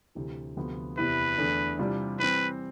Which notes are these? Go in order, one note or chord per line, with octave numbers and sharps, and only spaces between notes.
D2 C3 E3
D2 C3 F3 B3
E2 C3 E3 B3 E4 B4
E2 D3 A3 E4
C3 E3 G3 D4 F4
E3 G3 C4 B4